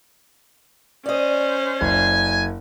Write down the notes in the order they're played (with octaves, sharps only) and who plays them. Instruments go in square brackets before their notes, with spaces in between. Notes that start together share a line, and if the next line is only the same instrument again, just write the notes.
[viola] C#4 C5 [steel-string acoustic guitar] D5 D#5
[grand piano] F#1 [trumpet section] G#5